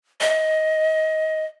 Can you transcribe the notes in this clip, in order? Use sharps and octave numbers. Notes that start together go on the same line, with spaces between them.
D#5